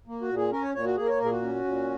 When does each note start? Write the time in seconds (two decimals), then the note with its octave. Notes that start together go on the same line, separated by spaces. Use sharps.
0.07 A#3
0.21 F#4
0.29 A#2
0.37 G#4
0.51 C#4 A#4
0.63 C#5
0.75 A#2 C#5
0.86 F#4
0.97 A#3 G#4
1.05 A#4
1.09 C#5
1.20 A#2 A#4
1.25 G#4
1.32 F#4
1.42 C#4
1.65 A#2